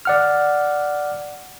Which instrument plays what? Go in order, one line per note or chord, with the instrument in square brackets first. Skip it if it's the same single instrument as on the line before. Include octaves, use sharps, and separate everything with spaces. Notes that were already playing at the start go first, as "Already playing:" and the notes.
[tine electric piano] D5 F#5 F6